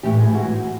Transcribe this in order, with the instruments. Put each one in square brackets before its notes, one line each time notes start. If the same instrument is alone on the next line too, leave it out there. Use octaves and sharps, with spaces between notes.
[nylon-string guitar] A2 E3 G4
G#4
G#2 E3 F#4